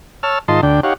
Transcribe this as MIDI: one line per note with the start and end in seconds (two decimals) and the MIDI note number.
0.23 0.39 73
0.23 0.39 81
0.23 0.39 88
0.23 0.39 89
0.48 0.61 44
0.48 0.61 51
0.48 0.61 65
0.48 0.61 75
0.48 0.61 81
0.48 0.61 84
0.63 0.80 38
0.63 0.80 50
0.63 0.80 62
0.63 0.80 79
0.83 0.94 63
0.83 0.94 67
0.83 0.94 73
0.83 0.94 77
0.83 0.94 78